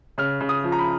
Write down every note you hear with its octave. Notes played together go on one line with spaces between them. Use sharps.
C#3 F6
C#3
D#6
F3
A#5
B5